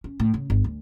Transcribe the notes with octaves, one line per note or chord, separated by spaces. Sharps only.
C#4
A2
C#3
G1
D2